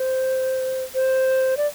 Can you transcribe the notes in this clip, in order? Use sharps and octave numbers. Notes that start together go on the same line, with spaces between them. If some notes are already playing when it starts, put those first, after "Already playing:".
Already playing: C5
C5
D5